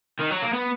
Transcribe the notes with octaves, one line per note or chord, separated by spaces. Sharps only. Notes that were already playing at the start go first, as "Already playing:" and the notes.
D#3
F#3
A#3
B3